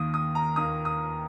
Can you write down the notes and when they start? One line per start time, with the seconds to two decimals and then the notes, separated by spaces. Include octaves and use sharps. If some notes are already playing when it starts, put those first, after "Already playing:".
Already playing: D#2 D#3 A#3 D#6
0.14 D#6
0.35 A#5
0.56 D#2 D#3 A#3 D#6
0.85 D#6